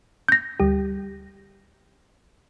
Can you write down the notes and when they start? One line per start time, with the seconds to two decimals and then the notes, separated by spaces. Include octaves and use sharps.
0.28 G6 A#6
0.60 D2 G3 G4